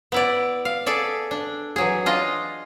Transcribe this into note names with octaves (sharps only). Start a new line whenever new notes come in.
B3 E4 D5
F5
G#4 A4 D5 E5
D4
E3 F#3 G#4
D4 F4 D#5